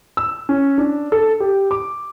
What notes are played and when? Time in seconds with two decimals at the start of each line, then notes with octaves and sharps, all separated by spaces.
0.17 E6
0.49 C#4
0.78 D4
1.12 A4
1.40 G4
1.71 D6